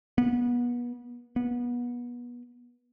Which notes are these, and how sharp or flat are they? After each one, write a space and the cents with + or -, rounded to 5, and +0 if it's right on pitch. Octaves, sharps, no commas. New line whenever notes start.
B3 -30
B3 -30